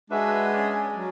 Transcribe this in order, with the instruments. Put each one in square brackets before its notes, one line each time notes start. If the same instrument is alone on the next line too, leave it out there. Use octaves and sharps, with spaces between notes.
[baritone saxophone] G#3 [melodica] D4 F#4 B4 E5
[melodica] C#4 G#4 D5
[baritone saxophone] F#3